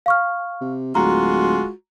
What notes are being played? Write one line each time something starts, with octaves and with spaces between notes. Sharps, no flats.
F5 C#6 F6
C3
D1 G#3 F4 F#4 A#5